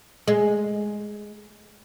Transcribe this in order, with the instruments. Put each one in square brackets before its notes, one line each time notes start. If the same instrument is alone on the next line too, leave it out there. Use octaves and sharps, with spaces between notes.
[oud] G#3